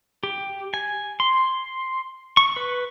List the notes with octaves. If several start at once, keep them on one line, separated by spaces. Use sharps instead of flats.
G4
G#5
C6
C#6
B4